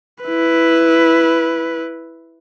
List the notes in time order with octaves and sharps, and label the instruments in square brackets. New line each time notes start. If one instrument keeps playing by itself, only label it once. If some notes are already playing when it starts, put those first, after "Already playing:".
[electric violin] E4 B4